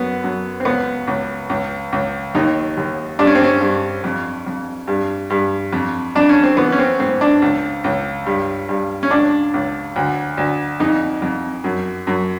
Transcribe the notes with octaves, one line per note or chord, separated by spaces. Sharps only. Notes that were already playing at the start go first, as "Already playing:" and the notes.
Already playing: F#2 B3
F#2
C4
C#2 B3
C#2
C#2
C#2
D#2 D#4
D#2
G2 D4
C#4
C4
C#4
G2
F2
F2
G2
G2
F2
F2 D4
C#4
C4
E3 B3
C#4
C4
G#2 C4
D4
C#2
C#2
G2
G2
C#4
C#2 D4
C#2
D2
D2
F2 D#4
F2
F#2
F#2